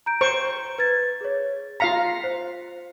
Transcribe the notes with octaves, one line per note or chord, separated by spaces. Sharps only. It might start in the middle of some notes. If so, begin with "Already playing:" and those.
A#5 G6 D7
C5 C#6
B4 G#6 A6
G#4 C#5
F4 F5 A#5 B6 C#7
C5